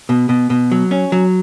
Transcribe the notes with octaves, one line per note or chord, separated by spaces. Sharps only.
B2
B2
B2
F#3
C#4
F#3